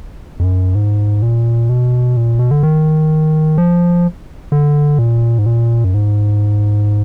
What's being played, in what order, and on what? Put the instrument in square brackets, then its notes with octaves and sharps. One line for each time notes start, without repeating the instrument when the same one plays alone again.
[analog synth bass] F2
F#2
G#2
A#2
B2
A#2
B2
D3
D#3
F3
D3
A#2
G#2
A#2
F#2
G#2